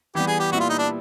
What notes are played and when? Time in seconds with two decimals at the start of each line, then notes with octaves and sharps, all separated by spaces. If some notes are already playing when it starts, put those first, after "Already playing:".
0.15 E3 G3 B3 G4
0.27 G#4
0.40 G4
0.51 A#2 G3 B3 E4 F#4
0.60 F4
0.69 D#4
0.78 D4